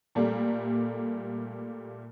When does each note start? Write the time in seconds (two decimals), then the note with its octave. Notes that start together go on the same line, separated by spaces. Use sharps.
0.15 A#2 G3 A3 A#3